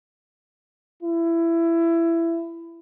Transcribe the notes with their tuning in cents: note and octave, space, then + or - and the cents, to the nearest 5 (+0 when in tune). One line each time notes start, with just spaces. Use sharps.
E4 +20